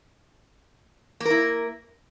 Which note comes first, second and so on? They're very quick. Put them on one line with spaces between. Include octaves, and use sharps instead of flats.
A#3 A#4 E4